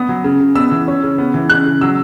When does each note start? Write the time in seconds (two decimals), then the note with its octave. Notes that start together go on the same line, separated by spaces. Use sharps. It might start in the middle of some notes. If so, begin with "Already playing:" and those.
Already playing: B3 D#6
0.09 F#3
0.24 C#3
0.40 C#3
0.55 B3 E6
0.72 E3
0.88 C#4
1.03 C#3
1.18 B3
1.34 E3
1.50 C#3 F#6
1.66 C#3
1.81 F#3 E6